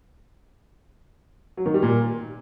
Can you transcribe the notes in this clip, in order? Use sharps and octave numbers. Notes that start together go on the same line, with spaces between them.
F#3
D#3
G3
A#2